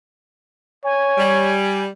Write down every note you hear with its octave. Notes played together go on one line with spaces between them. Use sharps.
C#5 G#5
G3